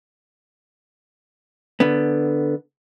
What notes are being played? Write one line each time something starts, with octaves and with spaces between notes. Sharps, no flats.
D3 B3